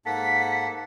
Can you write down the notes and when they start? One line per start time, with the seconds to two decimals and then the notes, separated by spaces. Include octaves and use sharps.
0.06 G#2 A#3 A4 F#5 B6